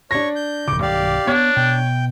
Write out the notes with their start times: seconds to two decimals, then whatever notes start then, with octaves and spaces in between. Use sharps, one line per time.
0.11 D4 C#5 C#6 A#6
0.36 G6
0.68 E1 C#3 D6
0.82 B1 G2 D#3 G4 D5 F5
1.27 B3 D4 C#5
1.57 B2 G5